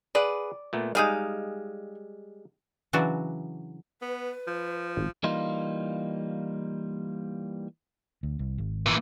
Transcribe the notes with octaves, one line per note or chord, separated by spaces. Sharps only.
G#4 B4 D5 F#5
A#2 A3 B3
G3 G#3 D#4 G#4 F5
C#3 E3 F#3 D4 F#4 D5
B3 B4
F3
G#1
E3 G3 A#3 D#4 F4
D2
C2
G#1
A#2 E3